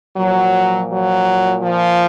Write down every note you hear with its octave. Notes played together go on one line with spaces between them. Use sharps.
A#2 F3 F#3
F#3
F3